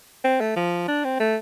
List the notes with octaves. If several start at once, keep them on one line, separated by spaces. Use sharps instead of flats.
C4
A3
F3
D4
C4
A3